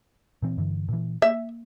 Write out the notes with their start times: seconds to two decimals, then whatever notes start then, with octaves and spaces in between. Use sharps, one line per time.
0.42 A#2 E3 C4
0.58 G2 D3 E3
0.88 A#2 E3
1.22 A#3 E5